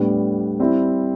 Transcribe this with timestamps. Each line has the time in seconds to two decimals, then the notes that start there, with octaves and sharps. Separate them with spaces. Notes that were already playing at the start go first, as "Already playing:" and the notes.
Already playing: A2 G3 B3 D4
0.59 G3 C4 E4